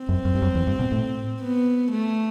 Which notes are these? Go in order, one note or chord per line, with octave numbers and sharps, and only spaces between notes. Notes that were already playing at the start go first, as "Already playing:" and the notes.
Already playing: C4
F#2
F#2
G2
F#2
E2
G2
B2
A2
B3
A3